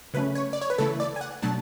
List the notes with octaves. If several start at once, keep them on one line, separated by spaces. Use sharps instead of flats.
C#3 F#3 A3 C#4 B4
C#5
D5
C#5
B4
C#3 E3 A3 E4 A4
D5
G#5
F#5
B2 F#3 A3 D4 A5